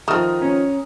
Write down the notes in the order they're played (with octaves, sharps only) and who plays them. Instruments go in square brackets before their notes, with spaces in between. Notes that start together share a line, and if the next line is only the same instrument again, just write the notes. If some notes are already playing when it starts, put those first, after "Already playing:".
[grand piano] D#3 F3 [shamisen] A3 C4 [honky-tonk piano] A#5 D#6 F6
[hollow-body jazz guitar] C#4